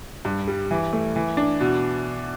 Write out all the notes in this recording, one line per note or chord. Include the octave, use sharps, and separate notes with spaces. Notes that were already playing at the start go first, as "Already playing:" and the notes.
G2
G3
E3
A3
E3
D4
B2